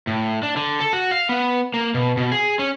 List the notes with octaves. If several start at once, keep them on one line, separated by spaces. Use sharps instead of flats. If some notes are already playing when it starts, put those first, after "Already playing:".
A2
D4
D3
A4
F#4
F5
B3
A#3
B2
B2
G#4
C#4